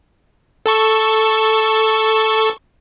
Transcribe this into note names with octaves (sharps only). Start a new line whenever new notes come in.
A4 A5 C#6